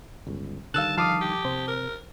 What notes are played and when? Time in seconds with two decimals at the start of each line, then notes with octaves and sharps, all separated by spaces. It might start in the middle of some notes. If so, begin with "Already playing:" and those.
0.27 G1 C#2
0.74 D3 D#3 G3 F5 A5 E6 F#6
0.97 F3 F5 A5 D6 D#6
1.21 G4
1.45 C3 C5
1.68 A#4